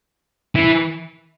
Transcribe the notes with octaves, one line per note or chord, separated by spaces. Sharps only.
E3